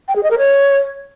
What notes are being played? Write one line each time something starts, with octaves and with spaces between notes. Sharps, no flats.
G5
G#4
D#5
A#4
C#5